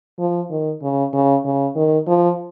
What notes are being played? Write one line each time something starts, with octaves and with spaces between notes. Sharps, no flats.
F3
D#3
C#3
C#3
C#3
D#3
F3